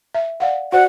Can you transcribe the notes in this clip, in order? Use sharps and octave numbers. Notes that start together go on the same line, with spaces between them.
E5
D5 F5 F#5
F#4 C5 D5 F#5